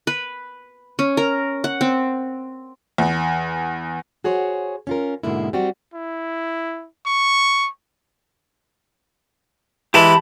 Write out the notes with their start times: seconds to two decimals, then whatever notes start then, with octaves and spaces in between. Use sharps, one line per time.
0.07 B4
0.99 C#4
1.17 A#4
1.64 F#5
1.81 C4
2.98 E2
4.24 F#4 G#4 C5 C#5
4.87 C#4 F4 A#4
5.23 G#2 B2 D3 G#3 A#3 E4
5.53 G3 C4 F#4
5.94 E4
7.06 C#6
9.94 E3 G#3 E4 G4 A5 B5